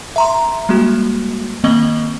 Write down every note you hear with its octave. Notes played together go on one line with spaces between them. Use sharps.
E5 A#5 C6
G3 G#3 A#3 F#4
D#3 A#3 C4 D#5 F#7 G7